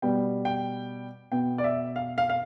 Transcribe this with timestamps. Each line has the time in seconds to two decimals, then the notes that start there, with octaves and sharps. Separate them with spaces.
0.02 B2 G3 B3 G5
0.45 G5
1.31 B2 B3 G5
1.58 D5
1.64 E5
1.96 F5
2.18 F5
2.29 F5